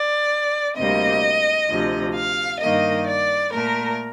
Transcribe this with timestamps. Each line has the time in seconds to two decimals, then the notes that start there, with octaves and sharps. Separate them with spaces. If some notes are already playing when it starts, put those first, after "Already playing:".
Already playing: D5
0.77 D2 C3 G3 A#3 D#5
1.69 D2 C3 F3
2.15 F5
2.61 G2 D#3 A#3 D#5
3.08 D5
3.53 A#2 A3 A#4